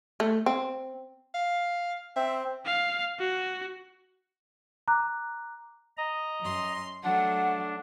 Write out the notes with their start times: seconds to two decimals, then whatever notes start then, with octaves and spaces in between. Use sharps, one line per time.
0.20 A3
0.46 C4
1.34 F5
2.16 C4 E5
2.66 F5
3.19 F#4
4.88 A#5 D6 F#6
5.97 D#5 A#5
6.41 F#2 C6
7.03 F#3 A3 D4 F#5